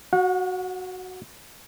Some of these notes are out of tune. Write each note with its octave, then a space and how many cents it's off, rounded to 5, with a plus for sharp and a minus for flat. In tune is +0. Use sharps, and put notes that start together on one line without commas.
F#4 +0 F#5 -40